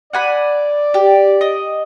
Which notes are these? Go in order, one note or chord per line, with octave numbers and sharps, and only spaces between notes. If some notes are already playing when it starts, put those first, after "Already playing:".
D5 F#5 G#5 B5
G4
D#5